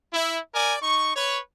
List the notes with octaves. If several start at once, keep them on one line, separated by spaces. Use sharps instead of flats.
E4
A#4 D5 G#5
D#4 C#6
B4 C#5